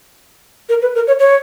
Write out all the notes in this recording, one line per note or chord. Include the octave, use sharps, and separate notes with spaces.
A#4
B4
A#4
C#5
C#5